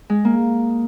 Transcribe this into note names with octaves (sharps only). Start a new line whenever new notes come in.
G#3
A#3